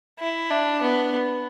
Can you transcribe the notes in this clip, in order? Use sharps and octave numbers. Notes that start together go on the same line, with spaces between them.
E4
D4
B3